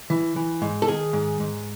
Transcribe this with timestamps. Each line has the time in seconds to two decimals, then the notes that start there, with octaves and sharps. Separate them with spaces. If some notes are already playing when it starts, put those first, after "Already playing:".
0.10 E3
0.36 E3
0.62 G#2
0.82 A4
0.88 D#3 G#4
1.13 G#2
1.40 G#2